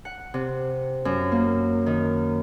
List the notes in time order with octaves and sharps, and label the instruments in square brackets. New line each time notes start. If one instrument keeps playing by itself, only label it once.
[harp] F#5
C3
F#2
A#3
D#3